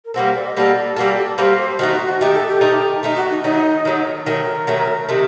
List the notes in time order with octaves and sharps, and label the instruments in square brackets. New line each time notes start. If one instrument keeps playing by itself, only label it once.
[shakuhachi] A#4
[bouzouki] G3 A#3 F#4 A4 [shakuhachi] C5
[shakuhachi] C5
D5
D#5
[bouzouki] G3 A#3 F#4 A4 [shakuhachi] D5
[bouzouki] G3 A#3 F#4 A4
[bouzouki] G3 A#3 F#4 A4 [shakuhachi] C5
[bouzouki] D#3 A3 D#4 [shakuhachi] F#4
[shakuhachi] F#4
F#4
[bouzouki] D#3 A3 D#4 [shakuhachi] G4
[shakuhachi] A4
G4
[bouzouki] D#3 A3 D#4
D#3 A3 D#4
[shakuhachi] F#4
D#4
[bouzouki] D#3 F#3 A3 [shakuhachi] D#4
[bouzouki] D#3 F#3 A3
[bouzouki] D#3 F#3 A3 [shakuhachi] A#4
[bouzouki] D#3 F#3 A3
C3 D#3 A3